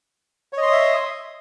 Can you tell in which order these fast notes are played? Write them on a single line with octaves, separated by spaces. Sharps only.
C#5 D#5 C6 D#6 E5